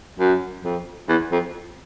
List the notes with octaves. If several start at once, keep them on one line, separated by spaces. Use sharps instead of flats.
F#2
F2
E2
F2